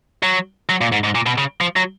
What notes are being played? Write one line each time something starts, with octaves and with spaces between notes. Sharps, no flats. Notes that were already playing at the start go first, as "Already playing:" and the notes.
F#3
F#3
A#2
G#2
G#2
A#2
B2
C#3
F3
F#3